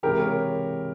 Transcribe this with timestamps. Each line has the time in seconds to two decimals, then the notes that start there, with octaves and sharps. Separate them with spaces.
0.03 C#2 C3 E3 G4 A#4
0.20 A#4 C#5